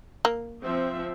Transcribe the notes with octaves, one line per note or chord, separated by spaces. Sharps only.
A#3
F3 C4 E5